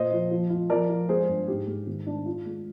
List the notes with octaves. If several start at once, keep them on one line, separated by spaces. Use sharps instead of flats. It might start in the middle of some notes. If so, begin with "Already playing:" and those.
Already playing: A#2 C5 D#5
F3
F3
F4
F3 A#4 D5
F3
G#3 G#4 C5
G2
G#2 G4
G#3
D#3
D4
F4
G#3